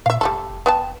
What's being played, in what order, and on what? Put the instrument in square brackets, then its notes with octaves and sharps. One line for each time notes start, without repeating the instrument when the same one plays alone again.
[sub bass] A#2 [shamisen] E5 F5
[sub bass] F1 [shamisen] G3 A3 A4
[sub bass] F1
[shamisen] B3 G5 A5